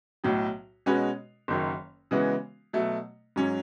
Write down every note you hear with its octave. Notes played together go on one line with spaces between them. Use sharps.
B1 A2 F#3
B2 G#3 C#4 F#4 B4
F#1 F#2 D#3 F#3
C#3 E3 G#3 B3 F#4
B2 F#3 A3
G#2 F#3 C#4